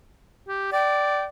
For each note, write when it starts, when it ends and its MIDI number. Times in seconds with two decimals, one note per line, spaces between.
0.49 0.70 67
0.72 1.28 74
0.72 1.25 79